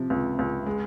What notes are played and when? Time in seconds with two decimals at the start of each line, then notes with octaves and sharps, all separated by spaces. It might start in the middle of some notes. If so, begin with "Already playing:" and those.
Already playing: C3 F3
0.10 C#2
0.39 C#2
0.66 G#3